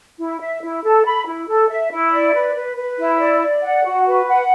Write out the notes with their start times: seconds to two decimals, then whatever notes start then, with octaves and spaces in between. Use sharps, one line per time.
0.19 E4
0.40 E5
0.62 E4
0.84 A4
1.05 B5
1.26 E4
1.48 A4
1.69 E5
1.91 E4
2.12 D5
2.34 B4
2.56 B4
2.77 B4
2.98 E4
3.19 D5
3.41 D5
3.63 F#5
3.84 F#4
4.06 B4
4.27 F#5